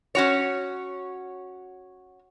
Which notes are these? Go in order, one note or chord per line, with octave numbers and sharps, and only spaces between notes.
C#4 F#4 C#5